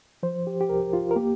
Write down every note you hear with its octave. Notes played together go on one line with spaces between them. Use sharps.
F3 C5
G4
G4
C2 A#4
F4
A#4
A#3 G4